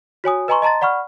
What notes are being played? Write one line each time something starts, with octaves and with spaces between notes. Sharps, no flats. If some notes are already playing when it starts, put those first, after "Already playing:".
F#4 C#5 G#5 D#6
B4 D#5 G#5 A#5 C6 C#6
D#5 A5 A#5 C6 A6
D5 F#5 B5 C#6 F6